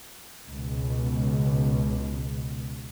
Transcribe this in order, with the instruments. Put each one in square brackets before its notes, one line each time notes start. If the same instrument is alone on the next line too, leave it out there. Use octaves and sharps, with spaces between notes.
[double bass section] C#2 B2